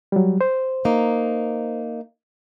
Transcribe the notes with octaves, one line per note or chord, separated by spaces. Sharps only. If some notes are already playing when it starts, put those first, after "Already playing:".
F#3 G3
C5
A#3 D#4